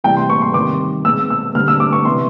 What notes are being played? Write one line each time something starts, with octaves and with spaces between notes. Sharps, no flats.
C3 E3 G3 G5
C6
C#6
C6
C3 D#3 G3 C4 D6
B2 G#3 C4 E6
E6
D3 G3 C4 F6
E6
D6
C#6
C3 E3 G3 B3 C6